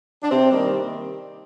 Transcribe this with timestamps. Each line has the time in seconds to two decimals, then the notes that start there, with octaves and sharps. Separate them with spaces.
0.23 D4
0.30 C3 C4
0.51 D#3 G3 A#3